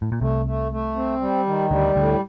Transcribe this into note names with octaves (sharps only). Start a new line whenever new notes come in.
A2
A#2
C2 C3 A3
A3
A3
C4
G3
D#3
D2 D3 G3
D2 A2 D3